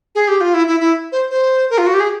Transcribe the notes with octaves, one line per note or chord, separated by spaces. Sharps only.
G#4
G4
F4
E4
E4
E4
C5
C5
A#4
F4
F#4
G4
G#4